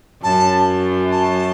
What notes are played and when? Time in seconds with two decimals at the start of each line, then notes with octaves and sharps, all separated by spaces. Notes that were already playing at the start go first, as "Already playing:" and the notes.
0.23 F#2 A5
1.12 A5